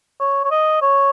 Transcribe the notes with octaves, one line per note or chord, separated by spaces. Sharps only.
C#5
C#5
D#5
C#5